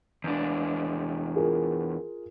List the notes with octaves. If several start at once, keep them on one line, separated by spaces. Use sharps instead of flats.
E2 D4
F4 G#4 A#4